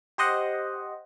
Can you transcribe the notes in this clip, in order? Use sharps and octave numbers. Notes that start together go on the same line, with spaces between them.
G4 C5 D#5 F#5